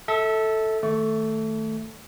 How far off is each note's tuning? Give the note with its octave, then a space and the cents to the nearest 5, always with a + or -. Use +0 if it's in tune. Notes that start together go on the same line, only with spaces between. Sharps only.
A4 +0 E5 -30
D#3 +0 A3 +0 C#6 +45